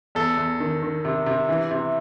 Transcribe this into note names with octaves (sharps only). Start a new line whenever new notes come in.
E2 A4
E2
D#3
D#3
C3
C3
E3
C3